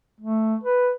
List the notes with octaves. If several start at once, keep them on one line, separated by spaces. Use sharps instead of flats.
A3
B4